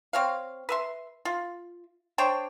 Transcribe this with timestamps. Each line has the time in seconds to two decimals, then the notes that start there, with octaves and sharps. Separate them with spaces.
0.13 C4 C#5 F5
0.69 B4 E5 C6
1.25 F4
2.18 D4 C5 C#5 G5